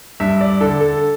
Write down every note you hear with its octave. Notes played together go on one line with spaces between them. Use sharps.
G2 E5
D5
D3 A4
A4